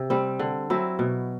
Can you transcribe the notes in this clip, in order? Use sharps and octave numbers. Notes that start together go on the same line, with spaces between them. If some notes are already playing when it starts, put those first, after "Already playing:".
Already playing: C3
G3 C4
D3
F#3 C4 E4
B2